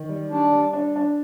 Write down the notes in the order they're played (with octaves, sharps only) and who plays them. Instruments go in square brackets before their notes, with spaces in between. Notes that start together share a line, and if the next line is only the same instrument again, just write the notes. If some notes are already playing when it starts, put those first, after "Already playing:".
Already playing: [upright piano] D#3
G3
[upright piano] G3 [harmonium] D4
[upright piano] G3
D4
D4